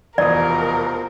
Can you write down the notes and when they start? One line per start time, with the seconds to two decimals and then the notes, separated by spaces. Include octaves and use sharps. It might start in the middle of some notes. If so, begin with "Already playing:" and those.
0.18 F1 E2 B2 F3 A#4 D5 D#6